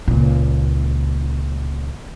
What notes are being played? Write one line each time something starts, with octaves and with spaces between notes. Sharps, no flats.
C#2 A#2